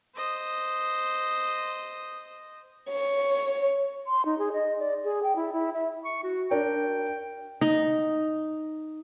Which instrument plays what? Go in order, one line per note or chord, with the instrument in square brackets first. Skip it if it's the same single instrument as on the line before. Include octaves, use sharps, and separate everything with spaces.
[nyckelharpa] C5 D#5
[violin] C#5
[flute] C6
D#4
G#4
D#5
D5
G#4
G5
E4
E4
E5
[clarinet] C#6
F#4
[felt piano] D4 A#4 D5 [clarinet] G5
[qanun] D#4